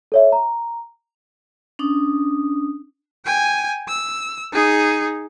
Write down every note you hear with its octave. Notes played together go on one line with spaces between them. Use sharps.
A4 C#5 E5
A#5
C#4 D4 D#6
G5 G#5
E6
D#4 G#4